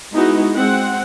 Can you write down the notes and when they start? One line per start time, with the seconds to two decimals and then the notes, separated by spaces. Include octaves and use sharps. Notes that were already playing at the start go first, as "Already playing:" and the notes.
0.12 G#3 B3 D#4 E4 F#4
0.55 G#3 C4 F#5